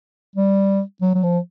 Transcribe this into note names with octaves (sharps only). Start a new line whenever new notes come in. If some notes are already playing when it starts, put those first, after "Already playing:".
G3
F#3
F#3
F3